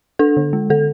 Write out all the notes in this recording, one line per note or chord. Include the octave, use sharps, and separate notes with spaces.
D4 A4
D3
G#3
D3 A4